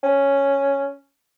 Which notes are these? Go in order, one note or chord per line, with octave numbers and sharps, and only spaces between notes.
C#4